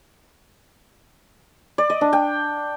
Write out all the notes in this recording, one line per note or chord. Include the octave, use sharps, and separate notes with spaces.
D5
D#5
D4
G5